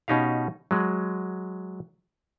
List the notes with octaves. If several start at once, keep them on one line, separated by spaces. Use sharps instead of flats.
B2 C#4 D#4 G4 F5
F#3 G#3